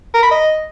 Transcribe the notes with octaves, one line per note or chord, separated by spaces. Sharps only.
A#4
B5
D#5